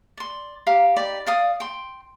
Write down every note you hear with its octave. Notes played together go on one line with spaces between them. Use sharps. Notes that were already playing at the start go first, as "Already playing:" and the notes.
D5 C6
G4 F5 A#5 D6
D#4 G4 D5 B5
D5 F5 D#6
G5 C6